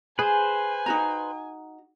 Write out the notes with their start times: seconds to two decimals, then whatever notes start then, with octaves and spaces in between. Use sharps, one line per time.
0.19 G#4 B4 C5 G#5
0.86 D#4 F#4 A#5